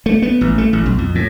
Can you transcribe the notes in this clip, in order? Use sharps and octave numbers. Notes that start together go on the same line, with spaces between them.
A3
B3
A1
A3
A1
B1
F2
A2